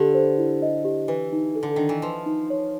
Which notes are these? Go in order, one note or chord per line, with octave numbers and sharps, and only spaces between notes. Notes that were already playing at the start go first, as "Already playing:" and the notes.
Already playing: D3 G4
C5
E4
D#5
G4
E3 B4
D#4
A4
D3
D#3 D4
E3
F3 B4
D#4
C#5